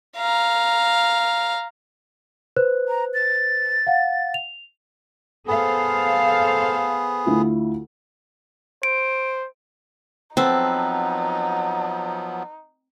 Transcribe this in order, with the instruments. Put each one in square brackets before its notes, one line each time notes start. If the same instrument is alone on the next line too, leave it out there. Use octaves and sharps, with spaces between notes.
[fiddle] F5 A#5
[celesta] B4 C5 F#6
[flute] A#5
A6
[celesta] F5 F#5
F7
[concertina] B3 G#4 [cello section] A4 C5 F5
[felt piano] D2 E4 F4
[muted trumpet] C5 [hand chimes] D7
[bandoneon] F3 F#3 B3 [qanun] C4 [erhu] D#4 [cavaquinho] A4 B4